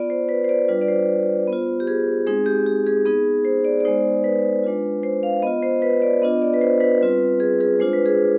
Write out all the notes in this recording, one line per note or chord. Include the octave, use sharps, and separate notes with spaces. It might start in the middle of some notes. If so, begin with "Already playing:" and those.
Already playing: B3 F4 D5
C5
B4
C5
D5
G3 D4 F4 B4
D5
C5
B3 F4
G4
G#4
G#3 C4 D#4 G#4
G4
G4
G#4
B3 D#4 G#4
C5
D5
D5
G#3 B3 D#4 C5
B4
G#3 D4 F4
C5
F5
B3 F4 D#5
C5
B4
D5
B3 D4 F4 D#5
D5
B4
C5
B4
G3 C4 F4
G#4
G#4
G#3 D4 F4 C5
B4
G#4